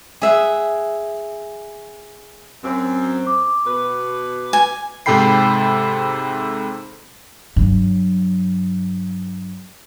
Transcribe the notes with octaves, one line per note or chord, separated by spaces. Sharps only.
G#4 E5 F#5
F#2 C4
D6
B2 B4
G#5
G#2 C3 A4 G5 B5 C7
G2 F#3